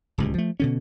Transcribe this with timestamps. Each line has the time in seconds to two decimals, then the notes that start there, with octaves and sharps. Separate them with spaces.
0.18 D1 C#2 G2
0.34 F3 A3
0.60 B2 D3 C#4